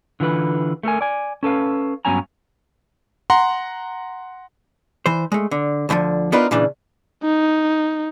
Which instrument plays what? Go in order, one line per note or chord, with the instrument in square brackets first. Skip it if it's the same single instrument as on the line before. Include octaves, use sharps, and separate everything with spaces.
[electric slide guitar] D3 E3 F4 B4
A3 A4 A#4 G#5
D5 G#5
C#4 A4 B4 F5
G2 F#3 B3 C#4 G#5 A#5
[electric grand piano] F#5 A#5 C6
[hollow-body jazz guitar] E3 C5
G#3 A3
D3
D2 A2 D3 F3
B3 D4 D#4 F4 A#4 B4
A#2 C#3 E3 D4
[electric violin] D#4